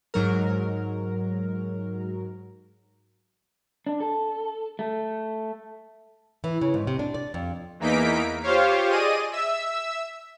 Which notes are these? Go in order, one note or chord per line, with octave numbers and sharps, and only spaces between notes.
G#2 F#3 A#4
D4
A4
A3
E3
C#3
G#2
C3
D4
D5
F2
E2 E3 A#3 D#4 B6 D7
F4 G4 C5 C#5 F5
G#4 D5 D#5 D#7
E5 E6